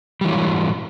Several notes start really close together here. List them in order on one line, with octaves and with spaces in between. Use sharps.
G3 E3 F#3 G#2